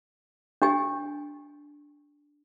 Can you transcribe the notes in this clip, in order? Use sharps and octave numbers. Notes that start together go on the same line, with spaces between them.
D4 G4 G#5